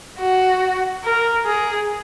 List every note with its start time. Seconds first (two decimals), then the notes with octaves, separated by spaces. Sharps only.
0.19 F#4
1.04 A#4
1.46 G#4